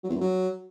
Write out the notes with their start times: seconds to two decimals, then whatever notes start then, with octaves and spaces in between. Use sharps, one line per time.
0.04 F#3
0.09 E2
0.15 F#2
0.21 F#3